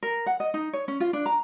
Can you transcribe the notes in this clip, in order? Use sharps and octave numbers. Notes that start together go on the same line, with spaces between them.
A#4
F#5
D#5
D#4
C#5
C#4
F4
D4
A#5